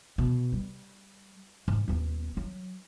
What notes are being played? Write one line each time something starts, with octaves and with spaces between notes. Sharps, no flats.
B2
G3
G#2
D#1 B3
F#3